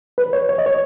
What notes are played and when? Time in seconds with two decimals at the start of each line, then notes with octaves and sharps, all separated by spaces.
0.18 B4
0.33 C#5
0.49 C#5
0.58 D#5
0.66 C#5